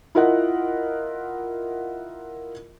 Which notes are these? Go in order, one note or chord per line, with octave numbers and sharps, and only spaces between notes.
E4 F4 A#4 D#5 F#5